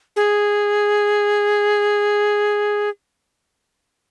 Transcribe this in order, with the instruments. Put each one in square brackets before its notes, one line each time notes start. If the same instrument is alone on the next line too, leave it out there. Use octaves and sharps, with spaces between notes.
[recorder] G#4